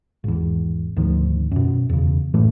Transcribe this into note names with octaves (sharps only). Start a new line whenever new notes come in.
G#1 E2
D2 G#2 D#3 F3
F#2 B2
E2 C#3
F#2 A2 E3 A3